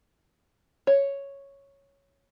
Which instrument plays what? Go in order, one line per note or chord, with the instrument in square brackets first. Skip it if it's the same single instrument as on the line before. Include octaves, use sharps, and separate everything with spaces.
[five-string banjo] C#5